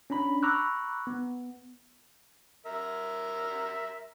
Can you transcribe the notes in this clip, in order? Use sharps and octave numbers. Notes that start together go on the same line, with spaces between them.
C#4 D4 A#5 B5
A#5 B5 C#6 D6 E6 F#6
B3
A#4 E5